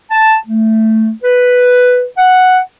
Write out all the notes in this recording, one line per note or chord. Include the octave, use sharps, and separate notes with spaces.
A5
A3
B4
F#5